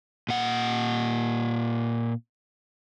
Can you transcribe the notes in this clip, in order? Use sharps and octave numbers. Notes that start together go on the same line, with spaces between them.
A#2 F#5